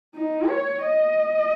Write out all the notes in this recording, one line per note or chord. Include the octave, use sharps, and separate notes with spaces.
D#4
C#5
D#5